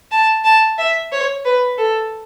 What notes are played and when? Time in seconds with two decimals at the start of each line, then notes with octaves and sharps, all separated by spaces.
0.11 A5
0.44 A5
0.78 E5
1.12 C#5
1.45 B4
1.78 A4